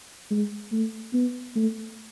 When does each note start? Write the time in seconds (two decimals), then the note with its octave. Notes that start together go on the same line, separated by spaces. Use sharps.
0.31 G#3
0.72 A3
1.14 B3
1.56 A3